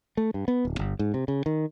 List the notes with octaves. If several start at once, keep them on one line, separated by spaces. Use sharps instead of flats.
A3
G2
B3
D1
G1
G#2
C3
C#3
D#3